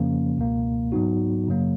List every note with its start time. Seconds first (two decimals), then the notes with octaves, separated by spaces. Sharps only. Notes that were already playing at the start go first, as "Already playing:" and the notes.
Already playing: F2 C#3 F3 A#3 C#4
0.37 C#2 B2 A#3
0.92 G#2 F#3 B3 D#4 F#4
1.48 F#2 C#3 F#3 A#3